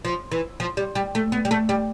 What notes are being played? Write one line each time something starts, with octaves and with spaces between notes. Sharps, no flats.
F3
E3
F3
G3
G3
A3
B3
G3
A3
G3